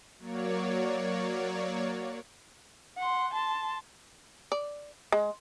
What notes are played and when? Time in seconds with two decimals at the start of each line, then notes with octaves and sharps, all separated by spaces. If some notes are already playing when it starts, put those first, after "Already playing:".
0.19 F#3 A#3 C#5 D5
2.97 F#5 C6
3.33 A5 C6
4.52 D5
5.12 G#3